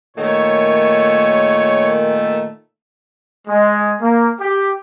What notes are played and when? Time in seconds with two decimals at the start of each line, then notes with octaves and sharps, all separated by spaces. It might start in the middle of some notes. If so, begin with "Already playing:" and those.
0.17 A#2 D#3 A3 C#5
3.48 G#3
4.02 A#3
4.41 G4